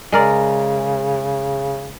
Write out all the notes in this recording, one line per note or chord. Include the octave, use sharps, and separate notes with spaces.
C#3 G#3 A#4 D5